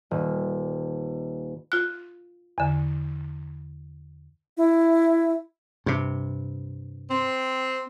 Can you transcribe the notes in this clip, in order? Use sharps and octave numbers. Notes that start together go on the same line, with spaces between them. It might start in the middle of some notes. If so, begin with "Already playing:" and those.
D#1
F4 F#6
E2 D3
E4
G2 C3
C4